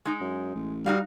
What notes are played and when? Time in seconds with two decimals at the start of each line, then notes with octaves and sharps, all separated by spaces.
0.05 G#3 D#4
0.20 F#2
0.55 A1
0.86 G3 D#4 F#4 F5